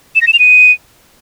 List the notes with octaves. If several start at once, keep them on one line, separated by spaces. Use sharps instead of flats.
E7
A#6
E7
F7
D#7